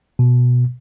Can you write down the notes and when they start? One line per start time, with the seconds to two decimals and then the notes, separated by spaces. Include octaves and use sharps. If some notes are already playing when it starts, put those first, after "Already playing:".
0.19 B2